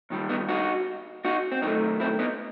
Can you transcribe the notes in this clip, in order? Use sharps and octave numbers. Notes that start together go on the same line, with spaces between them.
D#2 D#3 G3
B3 D#4
D#4 F#4
D#4 F#4
C4
F#2 D#3 A3 B3 D#4
C4 E4
B3 D#4